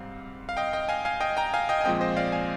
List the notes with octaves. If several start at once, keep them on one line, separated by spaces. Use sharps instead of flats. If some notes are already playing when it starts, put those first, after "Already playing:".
Already playing: G#2 G3 C4 F5
F5
D#5 G5
D#5 G5
F5 G#5
F5 G#5
D#5 G5
G5 A#5
F5 G#5
D#5 G5
G#5
A#2 F3 G#3 C4 D#5 G5
C5 D#5
D5 F5
F5 G#5